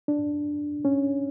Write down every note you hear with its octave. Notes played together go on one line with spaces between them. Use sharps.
D4
C#4